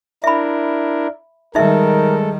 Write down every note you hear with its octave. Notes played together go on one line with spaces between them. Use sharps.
D4 E4 A#4 E5 B5
D#3 G3 G#3 D#4 A4 A#4 E5